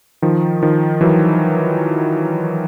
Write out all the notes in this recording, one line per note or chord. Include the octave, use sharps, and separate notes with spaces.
D#3 F3
D#3 F3
E3 F#3